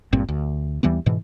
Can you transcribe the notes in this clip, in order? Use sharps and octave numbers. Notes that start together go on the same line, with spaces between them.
G#1 G2 A#2 C4
D2
D#2 E3 G3 B3
G#2 B2 E3